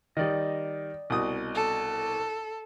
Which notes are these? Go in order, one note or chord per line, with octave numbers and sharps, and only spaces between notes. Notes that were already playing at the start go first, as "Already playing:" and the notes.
D#3 G3 D5 D#5
C2 B2 D#6
A4